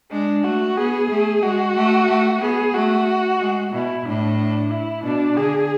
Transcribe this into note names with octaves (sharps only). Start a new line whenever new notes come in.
G#3 D4
A3 F#4
B3 G#4
A3
G#3 F#4
A3
A3
B3 G#4
A3 F#4
G#3
B2 E4
A2 D4
D4
E4
B2 D4
D3 G#4